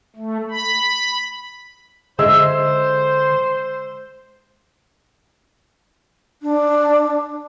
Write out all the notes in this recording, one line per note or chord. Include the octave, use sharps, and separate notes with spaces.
A3
B5
D3 G#3 C5 E5 E6
D4